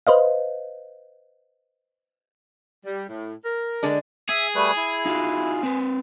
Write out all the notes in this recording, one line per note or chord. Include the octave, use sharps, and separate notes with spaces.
B4 C5 D#5 F5
G3
A2
A#4
D3 G#3 D4
G#4 E5
G3 A3 B4
E4
D#4 F4 F#4
C4 B4